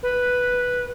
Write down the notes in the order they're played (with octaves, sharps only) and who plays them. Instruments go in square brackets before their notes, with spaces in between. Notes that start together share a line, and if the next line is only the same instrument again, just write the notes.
[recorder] B4